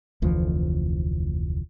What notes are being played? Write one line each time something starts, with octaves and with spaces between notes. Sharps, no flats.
F1 D2 E3 F3